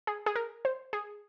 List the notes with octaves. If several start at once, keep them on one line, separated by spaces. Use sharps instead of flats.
G#4
G#4
A#4
C5
G#4